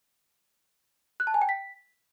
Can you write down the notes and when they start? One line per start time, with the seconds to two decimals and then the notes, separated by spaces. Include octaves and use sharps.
1.20 F#6
1.27 A5
1.34 G#5
1.42 G5
1.49 B6